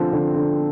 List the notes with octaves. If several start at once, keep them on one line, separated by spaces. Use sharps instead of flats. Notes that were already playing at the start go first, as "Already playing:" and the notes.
Already playing: D3 F3 C4
D3
D3